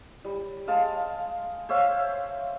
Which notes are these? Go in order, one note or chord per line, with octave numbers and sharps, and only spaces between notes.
G3
G#3 F5 A5
C5 C#5 E5 F5